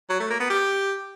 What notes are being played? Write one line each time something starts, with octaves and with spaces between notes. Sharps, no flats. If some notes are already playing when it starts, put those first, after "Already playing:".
F#3
A3
A#3
B3
G4